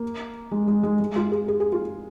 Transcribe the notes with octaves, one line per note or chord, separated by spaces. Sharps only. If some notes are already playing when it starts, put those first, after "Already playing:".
Already playing: A#3
G#3
G#3
G#3
G#3
F4
G#4
G#4
G#4
F4